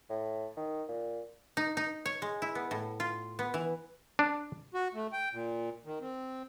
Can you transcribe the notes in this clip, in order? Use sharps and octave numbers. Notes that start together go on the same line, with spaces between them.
A2
D#3
A#2
D#4
D#4
C#5
G#3
E4
B3
A2
F4
B3
E3
D4
F#4
A3
G5
A#2
D#3
C4